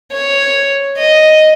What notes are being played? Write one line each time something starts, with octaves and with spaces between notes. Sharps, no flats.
C#5
D#5